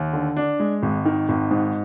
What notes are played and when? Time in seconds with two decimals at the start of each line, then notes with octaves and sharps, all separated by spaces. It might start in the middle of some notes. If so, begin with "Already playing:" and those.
Already playing: D#2
0.13 D3
0.36 D4
0.60 G#3
0.83 G#1
1.05 D#3
1.29 G#1
1.51 G#2